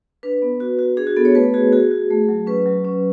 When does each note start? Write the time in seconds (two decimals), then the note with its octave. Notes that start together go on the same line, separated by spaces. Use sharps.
0.23 D4 B4
0.42 B3
0.60 F#4
0.79 F#4
0.97 D4 G#4
1.07 F#4
1.16 B3 A4
1.25 C#5
1.35 A3 B4
1.54 F#4 G#4
1.72 F#4 G#4
1.91 F#4
2.10 A3
2.29 F#3
2.47 C#4 B4
2.66 F#3
2.85 C#4